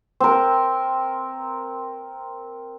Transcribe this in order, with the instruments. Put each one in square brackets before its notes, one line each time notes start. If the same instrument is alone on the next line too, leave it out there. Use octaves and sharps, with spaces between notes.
[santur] C4 A#4